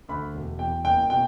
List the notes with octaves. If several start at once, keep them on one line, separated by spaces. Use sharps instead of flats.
D2 B5
E1
E2 G5
F#1 G5
B2 G5